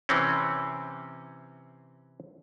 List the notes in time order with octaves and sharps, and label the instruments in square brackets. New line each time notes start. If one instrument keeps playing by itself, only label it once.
[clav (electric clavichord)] C3 E3 C4 C#4